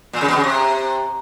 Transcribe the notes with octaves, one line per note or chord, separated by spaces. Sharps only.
A#2
C#3
B2
C#3
C3